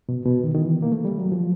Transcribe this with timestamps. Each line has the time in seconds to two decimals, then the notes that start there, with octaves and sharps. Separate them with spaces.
0.09 B2
0.26 B2
0.44 D#3
0.54 D#3
0.61 E3
0.82 A#3
0.92 A3
1.05 G3
1.18 F#3
1.32 F3